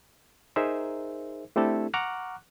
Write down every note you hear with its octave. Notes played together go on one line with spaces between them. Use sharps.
D#4 G#4 A#4 C5 E5
A3 C4 D4 E4 G4 A4
F#5 A#5 C#6 D6 F6 F#6